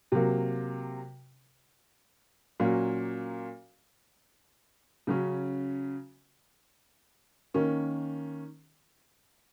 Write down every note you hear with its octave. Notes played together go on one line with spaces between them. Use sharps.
C3 F#3 A#3
A#2 F#3 A#3 C#4
C#3 F#3 C#4
D#3 A#3 C#4